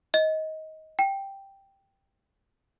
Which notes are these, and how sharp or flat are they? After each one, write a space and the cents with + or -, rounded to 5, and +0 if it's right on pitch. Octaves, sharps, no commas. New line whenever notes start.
D#5 +20
G5 +0